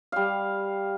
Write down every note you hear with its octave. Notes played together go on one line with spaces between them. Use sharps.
G3 F5